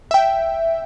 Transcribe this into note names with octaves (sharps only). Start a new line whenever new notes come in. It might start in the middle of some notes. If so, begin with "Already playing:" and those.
E5 G5